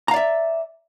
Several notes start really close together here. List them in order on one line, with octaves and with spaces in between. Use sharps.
A#5 F5 D5 E5